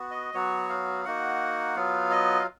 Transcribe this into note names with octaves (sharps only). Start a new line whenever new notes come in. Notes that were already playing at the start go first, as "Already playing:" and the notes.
Already playing: B3 F#4
D#5
F#3 B3 F#4 C#5
F5
A#3 D#4 F#4 F#5
F#3 B3 F4 F5
D#5
F5